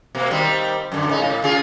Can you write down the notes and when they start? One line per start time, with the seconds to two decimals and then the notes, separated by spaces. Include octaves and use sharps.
0.15 B2 A#3
0.31 D#3 G3 C4
0.92 F#2 D3
1.07 A2 C#3 D#4
1.21 A2
1.44 C#3 F4 G#4